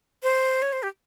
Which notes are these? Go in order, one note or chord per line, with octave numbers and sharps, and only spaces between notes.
C5
C#5
C5
G4